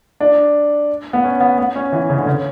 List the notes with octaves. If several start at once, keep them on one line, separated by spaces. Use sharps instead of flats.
D4
B3
C#4
B3
B3
C#4
E3
C#3
D3
C#3